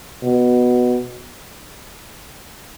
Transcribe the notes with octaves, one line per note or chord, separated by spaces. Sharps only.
B2